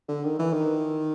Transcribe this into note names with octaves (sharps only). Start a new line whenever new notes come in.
D3
D#3
E3
D#3